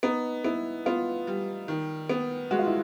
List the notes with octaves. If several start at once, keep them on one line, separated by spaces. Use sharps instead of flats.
B3 D#4
B3 E4
B3 F4
G3
D#3
B3
G#3 F#4
F4
E4